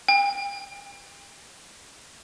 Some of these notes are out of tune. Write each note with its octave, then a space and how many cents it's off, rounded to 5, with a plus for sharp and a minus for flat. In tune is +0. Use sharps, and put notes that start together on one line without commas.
G5 +40